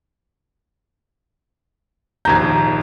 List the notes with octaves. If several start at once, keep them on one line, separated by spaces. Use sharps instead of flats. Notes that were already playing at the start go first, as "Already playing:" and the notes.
A#1 D#2 A#5 G6 G#6